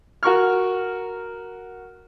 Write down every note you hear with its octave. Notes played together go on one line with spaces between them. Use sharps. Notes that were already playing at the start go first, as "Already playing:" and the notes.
F#4 A#4 C#6 F6